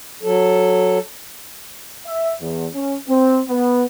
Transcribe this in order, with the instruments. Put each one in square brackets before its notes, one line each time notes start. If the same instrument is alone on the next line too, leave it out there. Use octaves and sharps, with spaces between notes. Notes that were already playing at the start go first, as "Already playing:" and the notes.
[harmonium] F#3 A4
[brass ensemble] E5
E2
C#4
C4
B3